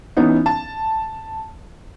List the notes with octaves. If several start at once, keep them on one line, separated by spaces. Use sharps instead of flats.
E3 B3 C#4 D#4
A5